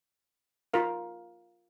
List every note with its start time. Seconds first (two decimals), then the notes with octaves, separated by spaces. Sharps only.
0.74 F4 A#4 F5